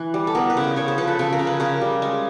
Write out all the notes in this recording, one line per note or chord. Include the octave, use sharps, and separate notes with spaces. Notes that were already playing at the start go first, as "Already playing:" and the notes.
Already playing: E3 B4
G3
A4
B3 A#4
B4
C#3
C5
C#3 C#5
C5
F3 B4
A4
C#3 A4
A#4
C#3
B4
C#3 A#4
G3
G#3